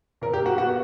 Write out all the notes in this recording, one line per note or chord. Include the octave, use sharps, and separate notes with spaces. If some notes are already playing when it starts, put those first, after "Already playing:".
A#2 A#4
G4
A#3
F#4
B3 F#4